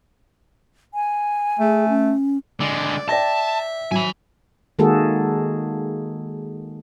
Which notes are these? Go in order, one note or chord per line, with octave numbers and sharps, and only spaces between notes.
G#5
A3 G#4
C#4
D3 G#3 D5
D5 E5 G5 A5 A#6
F#3 G#5 B5
D#3 G#3 A#3 F#4 G#4 A4